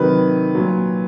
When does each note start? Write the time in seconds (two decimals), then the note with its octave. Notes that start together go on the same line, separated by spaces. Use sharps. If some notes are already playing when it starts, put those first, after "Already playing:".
Already playing: C3 D#3 F#3 B4
0.55 A#2 F#3